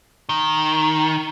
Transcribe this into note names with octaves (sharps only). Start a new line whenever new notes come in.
D#3